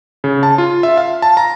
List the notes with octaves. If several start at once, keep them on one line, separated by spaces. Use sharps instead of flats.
C#3
A5
F4
E5
F5
A5
A#5